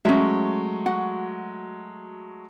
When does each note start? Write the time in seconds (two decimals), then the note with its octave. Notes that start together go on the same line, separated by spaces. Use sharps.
0.05 F#3 G#3 A3 C#4 E5
0.86 F#4 F#5